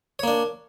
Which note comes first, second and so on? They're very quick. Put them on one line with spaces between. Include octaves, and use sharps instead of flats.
C#5 A#3 D4